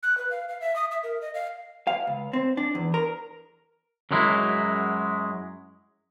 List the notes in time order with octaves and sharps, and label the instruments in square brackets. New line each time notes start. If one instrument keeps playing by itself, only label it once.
[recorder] F#6
B4
F5
F5
E5
D#6
E5
A#4
D#5
F5
[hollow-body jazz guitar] F5
C#2
C4
D4
E2
A#4
[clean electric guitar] F#2 F#3 G#3 E4